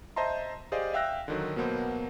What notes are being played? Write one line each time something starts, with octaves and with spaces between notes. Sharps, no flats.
C5 D#5 E5 A5 A#5 C6
G4 G#4 C5 D5 D#5 F5
E5 F5 G5 E6 F#6 A#6
D3 D#3 F#3
B2 F#3 A#3 B3 C5